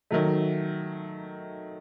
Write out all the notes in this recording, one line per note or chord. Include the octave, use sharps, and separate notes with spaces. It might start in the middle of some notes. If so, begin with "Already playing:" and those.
D#3 F#3 A3